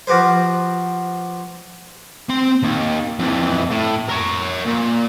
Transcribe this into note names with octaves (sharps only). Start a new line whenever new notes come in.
F3 F#4 G4 B4 C5
C4 C6
D#2
F2 E3
A2
A#4 C#5
A#2